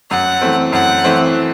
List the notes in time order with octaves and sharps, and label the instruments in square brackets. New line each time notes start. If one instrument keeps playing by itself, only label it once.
[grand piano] F#2 [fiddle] F#5
[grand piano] E3 A3 C4
[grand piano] F#2 [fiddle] F#5
[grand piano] E3 A3 C4